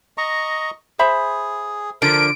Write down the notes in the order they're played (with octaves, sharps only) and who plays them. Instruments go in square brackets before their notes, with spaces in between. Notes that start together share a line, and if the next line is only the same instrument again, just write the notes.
[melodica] D#5 A#5 C#6
[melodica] G#4 [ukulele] C5 E5 B5
[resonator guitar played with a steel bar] D3 F3 [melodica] A#4 [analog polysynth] D7